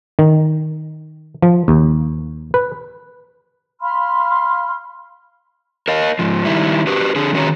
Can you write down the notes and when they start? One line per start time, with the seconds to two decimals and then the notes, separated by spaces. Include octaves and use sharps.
0.19 D#3
1.42 F3
1.68 D#2
2.54 B4
3.81 F5 B5 C6 F6
5.88 A#4 D#5 F5
6.19 G#2 F3
6.45 D#3 G3 E4
6.87 F#4 G4 B4
7.16 D3 G#4
7.33 D#3 C#4 F#4 G#4 C#5 A#5